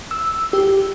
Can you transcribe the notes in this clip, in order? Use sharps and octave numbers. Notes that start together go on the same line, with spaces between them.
E6
G4